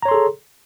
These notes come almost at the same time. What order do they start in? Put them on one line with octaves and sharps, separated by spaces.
A#5 C#5 C6 A4 G#4